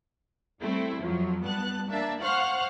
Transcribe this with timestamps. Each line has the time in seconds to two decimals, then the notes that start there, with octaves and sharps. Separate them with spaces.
0.61 G3 A3 C4 E4
1.01 F2 F3 F#3
1.42 G3 B3 A5 F#6
1.88 A#3 D4 E5 A5
2.21 C5 F5 F#5 C#6 F6 F#6